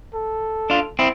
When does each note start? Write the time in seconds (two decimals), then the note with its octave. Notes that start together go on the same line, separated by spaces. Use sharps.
0.14 A4
0.70 D4 F4
0.99 C4 E4